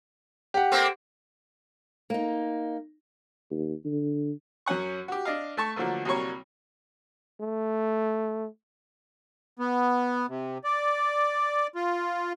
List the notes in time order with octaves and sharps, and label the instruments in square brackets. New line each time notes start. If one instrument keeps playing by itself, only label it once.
[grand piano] G4 F#5
[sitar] A3 A#3 C4
[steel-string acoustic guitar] A#3 D#4
[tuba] D#2
D3
[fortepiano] F#2 F#3 C#4 F#5 C#6
F#4 G4
D4 D#5 F5
A3 A5 C#6
D3 F3 F#3 A3 A#3
C2 F#3 G3 A#3 C#5 C#6
[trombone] A3
[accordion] B3
C3
D5
F4